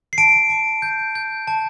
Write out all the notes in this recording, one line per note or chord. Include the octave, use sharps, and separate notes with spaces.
C7
A5 D7
A5
G6
G6
A5